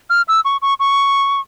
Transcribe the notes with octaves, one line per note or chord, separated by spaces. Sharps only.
F6
E6
C#6
C#6
C#6